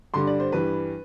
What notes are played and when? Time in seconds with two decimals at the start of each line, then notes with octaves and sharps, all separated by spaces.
0.14 G2 D3 G3 C6
0.27 D5
0.40 C5
0.52 G2 E3 G3 B4